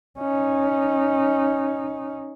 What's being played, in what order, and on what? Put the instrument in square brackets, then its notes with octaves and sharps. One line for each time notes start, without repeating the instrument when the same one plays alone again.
[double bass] C#4 D#4